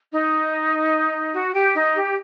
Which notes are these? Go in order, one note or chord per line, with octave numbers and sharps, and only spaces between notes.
D#4
F#4
G4
D#4
G4